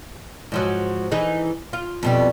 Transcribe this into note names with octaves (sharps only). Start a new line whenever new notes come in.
G#2 F3 F#3
E3 D#4 G#4
F4
F2 B2 G3